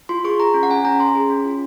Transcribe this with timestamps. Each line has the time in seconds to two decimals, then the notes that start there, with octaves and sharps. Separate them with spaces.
0.09 F4 C6
0.24 G#4 C#6
0.40 G#4 A#5
0.54 C#4
0.63 F#5
0.70 C#4 G#5
0.85 C#4 A#5
0.99 C#4 C6
1.15 G#4
1.30 C#4
1.45 F4